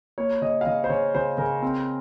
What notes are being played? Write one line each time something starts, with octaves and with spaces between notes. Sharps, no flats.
A#3 C#5
C#3 D#5
F5
C#3 D#5
C5
C#3 C#5
C#3 C5
C#3 A#4
C4